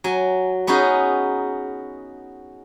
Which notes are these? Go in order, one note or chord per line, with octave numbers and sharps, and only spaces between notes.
F#3 G#5
B3 C#4 D#4 F#4 G#4